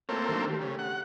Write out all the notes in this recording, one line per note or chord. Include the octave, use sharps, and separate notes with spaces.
A3 A#3 C4 F4 C#5
D#3 F#3 D4
A3 G4
C#3
F#5